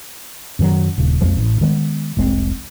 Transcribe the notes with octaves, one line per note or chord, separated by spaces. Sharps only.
F#2 D#3 F#3
D#1 C#3
A#1 F2 F3 G#3
A1
D#3 G#3 A3 B3
F1 C2 G#3 C4